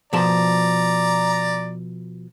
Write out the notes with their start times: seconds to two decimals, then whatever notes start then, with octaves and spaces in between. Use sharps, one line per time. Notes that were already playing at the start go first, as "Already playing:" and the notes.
0.13 B2 F3 D5 A5 A#5